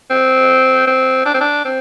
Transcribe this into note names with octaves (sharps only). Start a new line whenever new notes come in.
C4
C4
D4
C4
D4
C4